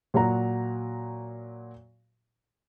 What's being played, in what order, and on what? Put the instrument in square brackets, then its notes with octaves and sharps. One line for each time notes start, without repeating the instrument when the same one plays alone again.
[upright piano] A#2 F#3 F#4 A#5